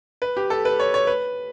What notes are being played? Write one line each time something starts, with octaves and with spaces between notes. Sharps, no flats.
B4
G4
A4
B4
C#5
C#5
B4